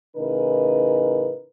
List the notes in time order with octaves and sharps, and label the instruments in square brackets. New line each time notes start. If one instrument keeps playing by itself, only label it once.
[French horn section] A2 C#3 E3 D#4 A#4 B4